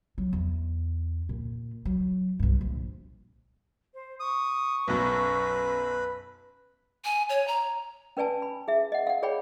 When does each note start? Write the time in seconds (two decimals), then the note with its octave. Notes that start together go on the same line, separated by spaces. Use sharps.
0.18 F#3
0.33 E2
1.29 A#2
1.85 F#3
2.39 B1 G2
2.61 A#1
3.94 C5
4.20 C#6 D#6
4.88 B1 F#2 B4
7.05 G#5
7.29 C#5
7.48 A#5
8.17 C#4 B4 D5 G#5 A5
8.42 B5
8.68 G#4 E5
8.92 D#5 F#5
9.07 F5 F#5
9.23 G#4 C#5 D5 G5 B5